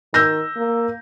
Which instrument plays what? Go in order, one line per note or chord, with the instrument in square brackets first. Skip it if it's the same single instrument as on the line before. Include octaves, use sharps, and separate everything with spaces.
[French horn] D#3 [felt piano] E6 G6 A#6
[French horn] A#3